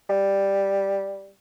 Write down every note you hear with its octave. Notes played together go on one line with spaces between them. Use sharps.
G3